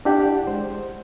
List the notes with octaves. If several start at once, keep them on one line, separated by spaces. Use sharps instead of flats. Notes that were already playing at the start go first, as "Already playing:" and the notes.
D4 E4 G4 D5 F#5 G5
G#3 C5